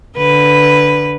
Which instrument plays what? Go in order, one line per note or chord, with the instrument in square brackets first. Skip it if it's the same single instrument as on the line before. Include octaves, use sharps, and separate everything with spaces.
[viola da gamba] D3 B4